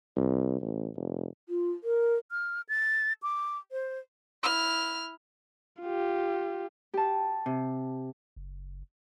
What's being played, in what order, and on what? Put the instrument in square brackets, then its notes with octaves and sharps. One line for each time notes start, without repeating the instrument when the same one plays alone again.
[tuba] C2
A1
F1
[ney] F4
A#4
[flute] F6
A6
D6
C5
[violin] E4 F6
[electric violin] F4 G4
[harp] G4 A5
[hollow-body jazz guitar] C3
[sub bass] F#1